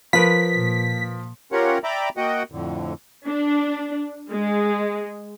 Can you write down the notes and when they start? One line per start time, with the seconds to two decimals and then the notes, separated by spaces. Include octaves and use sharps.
0.13 F3 A#4 B4 B5 B6
0.55 A#2
1.52 C#4 F4 G4 A#4 C#5 F#5
1.84 D5 E5 G5 A#5 B5 D6
2.17 A#3 F#4 D#5 F#5 G5
2.52 F2 A2 D3
3.27 D4
4.30 G#3